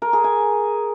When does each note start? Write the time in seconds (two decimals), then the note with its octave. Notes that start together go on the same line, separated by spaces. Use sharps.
0.02 A#4
0.13 G#4
0.24 G#5